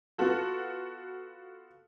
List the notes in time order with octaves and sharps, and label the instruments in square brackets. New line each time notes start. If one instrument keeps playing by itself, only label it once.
[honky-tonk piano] B3 F4 F#4 A4